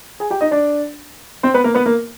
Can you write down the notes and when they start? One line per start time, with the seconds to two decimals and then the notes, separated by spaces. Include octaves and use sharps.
0.20 G#4 G#5
0.31 G4 G5
0.41 D#4 D#5
0.51 D4 D5
1.43 C4 C5
1.54 B3 B4
1.64 A#3 A#4
1.74 B3 B4
1.86 A#3 A#4